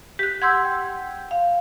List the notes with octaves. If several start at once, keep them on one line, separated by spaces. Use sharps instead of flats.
G4 F#6 B6
F#5 C6 E6 G6 G#6
G5
F5